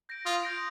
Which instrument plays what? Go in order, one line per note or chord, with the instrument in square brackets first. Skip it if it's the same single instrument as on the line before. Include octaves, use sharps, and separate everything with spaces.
[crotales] G6 A#6 D7
[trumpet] F4 [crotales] D#6
[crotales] G6 A#6 D7